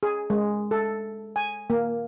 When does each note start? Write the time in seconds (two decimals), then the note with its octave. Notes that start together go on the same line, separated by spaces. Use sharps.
0.03 G#4
0.30 G#3
0.71 A4
1.36 G#5
1.70 A#3